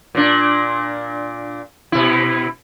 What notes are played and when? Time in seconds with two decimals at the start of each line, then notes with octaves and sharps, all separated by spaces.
0.15 A#2 D4
1.92 B2 E4